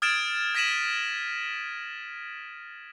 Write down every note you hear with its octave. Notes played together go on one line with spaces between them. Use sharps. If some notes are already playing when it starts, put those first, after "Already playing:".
D#6 F6 G#6 A6 D7 E7
G#6 A#6 B6 D#7 E7 F#7